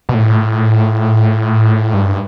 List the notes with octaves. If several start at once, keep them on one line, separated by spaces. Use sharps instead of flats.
B2
A2
G2